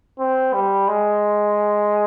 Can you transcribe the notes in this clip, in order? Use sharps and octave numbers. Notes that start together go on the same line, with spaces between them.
C4
G3
G#3